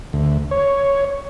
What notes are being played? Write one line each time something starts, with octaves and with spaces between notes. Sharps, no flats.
D2
C#5